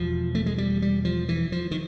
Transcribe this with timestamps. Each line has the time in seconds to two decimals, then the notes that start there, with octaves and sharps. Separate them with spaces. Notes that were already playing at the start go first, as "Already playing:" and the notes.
Already playing: E1 E2 B2 F3
0.35 A3
0.46 G#3
0.58 G3
0.82 G3
1.05 F3
1.29 E3
1.52 F3
1.71 D#3